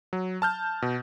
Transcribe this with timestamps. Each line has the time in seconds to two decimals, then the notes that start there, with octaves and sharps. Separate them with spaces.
0.13 F#3
0.42 A5 F6 G6
0.82 B2